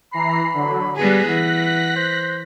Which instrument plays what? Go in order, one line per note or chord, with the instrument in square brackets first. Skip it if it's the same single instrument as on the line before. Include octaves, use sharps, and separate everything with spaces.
[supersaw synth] E3 A#5 C7 [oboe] B5
[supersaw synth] D3 F#3
[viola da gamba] G3 B3 G#4 [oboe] G#5 [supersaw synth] F#6 A#6 B6
[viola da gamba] E3 [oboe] F#5
[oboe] C5